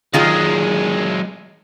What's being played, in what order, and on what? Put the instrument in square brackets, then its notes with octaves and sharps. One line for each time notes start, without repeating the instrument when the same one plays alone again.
[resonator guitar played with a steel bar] D#3 F4 G#4 [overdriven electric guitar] F#3 G#3